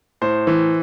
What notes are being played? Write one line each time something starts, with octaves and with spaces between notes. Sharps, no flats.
A2 C5
E3